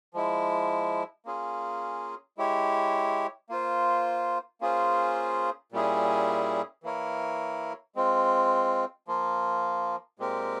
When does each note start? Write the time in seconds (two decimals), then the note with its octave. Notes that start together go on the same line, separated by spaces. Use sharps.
0.14 F3 G#3 E4
1.26 A#3 C#4 F4 G#4
2.38 G#3 E4 G4 C#5
3.49 A#3 F4 C5
4.61 A#3 C#4 F4 G#4 C5
5.72 A#2 G3 C#4 E4 G#4
6.83 E3 A#3 E4 A#4 C#5
7.95 G#3 C4 F4
9.08 F3 A#3 F4
10.19 A#2 G#3 C4 G4 A#4